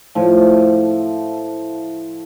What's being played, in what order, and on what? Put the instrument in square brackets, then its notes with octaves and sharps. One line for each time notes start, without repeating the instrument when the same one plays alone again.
[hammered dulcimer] A2 F3